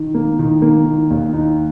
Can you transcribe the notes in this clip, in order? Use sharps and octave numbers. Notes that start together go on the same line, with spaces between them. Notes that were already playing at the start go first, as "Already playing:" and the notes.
Already playing: D#3
A#3
D#3
A#3
D#3
D#2
D#4